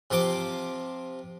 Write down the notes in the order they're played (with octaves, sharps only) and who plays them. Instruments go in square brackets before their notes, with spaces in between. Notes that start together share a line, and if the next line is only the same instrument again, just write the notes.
[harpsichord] C3 F3 C6 D6